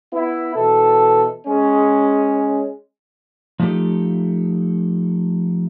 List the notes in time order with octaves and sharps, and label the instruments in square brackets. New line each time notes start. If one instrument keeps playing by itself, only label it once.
[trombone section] B3 E4
B2 E3 A4
G#3 C#4
[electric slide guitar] F3 F#3 A3 D#4 G4 A4